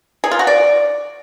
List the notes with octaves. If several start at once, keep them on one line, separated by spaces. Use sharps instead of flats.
G#4
F4
F#4
D5